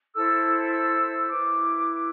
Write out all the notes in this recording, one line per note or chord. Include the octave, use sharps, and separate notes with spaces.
E4 A4 C5 E6
E6
E4 B4 D6